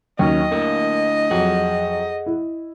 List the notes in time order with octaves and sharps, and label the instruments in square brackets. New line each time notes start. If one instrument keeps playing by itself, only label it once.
[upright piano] D#2 F#3 [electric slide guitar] C#4 [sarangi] D#5
[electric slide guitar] D3 A3 E4 [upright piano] A#3
[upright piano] F2 F#3 [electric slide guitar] G#4 F#5
[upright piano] E4